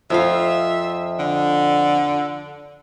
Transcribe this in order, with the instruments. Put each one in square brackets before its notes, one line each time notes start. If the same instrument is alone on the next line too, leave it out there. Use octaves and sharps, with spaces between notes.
[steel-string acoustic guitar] F2 F4 F5 [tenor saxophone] E5
[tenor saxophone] D3